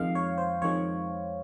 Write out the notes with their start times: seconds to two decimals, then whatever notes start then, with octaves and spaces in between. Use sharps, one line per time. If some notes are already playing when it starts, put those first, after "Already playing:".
Already playing: F2 D#3 G#3 F5
0.15 C#5
0.38 C5
0.62 F2 D#3 G#3 C#5